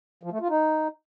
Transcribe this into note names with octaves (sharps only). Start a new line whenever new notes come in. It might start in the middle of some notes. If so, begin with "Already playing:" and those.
F3
A3
F4
D#4